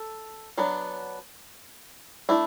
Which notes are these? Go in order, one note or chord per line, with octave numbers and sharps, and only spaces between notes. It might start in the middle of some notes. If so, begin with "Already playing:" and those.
Already playing: A4
F#3 B3 D4
A3 D4 E4